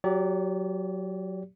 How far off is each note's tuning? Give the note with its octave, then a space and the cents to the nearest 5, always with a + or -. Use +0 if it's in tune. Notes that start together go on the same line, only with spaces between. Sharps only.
F#3 +0 G4 +0 D5 -35